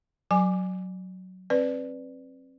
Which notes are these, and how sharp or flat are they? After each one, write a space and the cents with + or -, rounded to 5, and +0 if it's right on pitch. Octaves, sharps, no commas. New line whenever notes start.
F#3 +0 G#5 +0 D6 +0
C4 +30 B4 +5 D5 +0